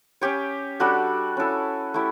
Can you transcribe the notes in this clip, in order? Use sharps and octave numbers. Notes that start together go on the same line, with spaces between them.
C#4 G4 C#5
G3 D4 F#4 A4
C#4 E4 A4
A3 E4 G4